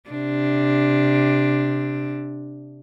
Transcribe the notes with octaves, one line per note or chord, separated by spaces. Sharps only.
C3 D4